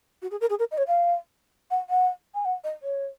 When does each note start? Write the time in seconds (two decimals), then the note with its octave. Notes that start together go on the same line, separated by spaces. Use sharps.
0.22 F#4
0.31 G#4
0.41 A#4
0.50 G#4
0.59 A#4
0.71 D#5
0.78 C#5
0.87 F5
1.71 F#5
1.90 F#5
2.35 G#5
2.45 F#5
2.64 D#5
2.83 C#5